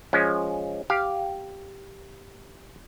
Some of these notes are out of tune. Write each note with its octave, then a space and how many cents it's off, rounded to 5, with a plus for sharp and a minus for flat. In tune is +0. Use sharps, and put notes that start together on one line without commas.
F3 +0 G#3 +0 C#4 +10
G4 +0 F5 +0